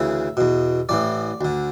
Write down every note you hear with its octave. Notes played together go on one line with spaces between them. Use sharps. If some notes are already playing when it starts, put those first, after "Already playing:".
Already playing: D2 C#3 E3 E5
E2 B2
A1 A2 E3 D5
D2 D3